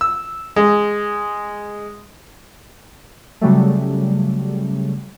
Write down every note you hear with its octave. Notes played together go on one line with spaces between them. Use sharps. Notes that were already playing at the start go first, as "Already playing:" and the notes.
E6
G#3
C#3 F#3 G3 A3